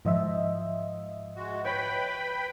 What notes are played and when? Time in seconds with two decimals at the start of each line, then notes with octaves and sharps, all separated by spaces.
0.05 G#2 F3 D#5 E5
1.36 G#3 F#4
1.65 B4 C#5 G5 B5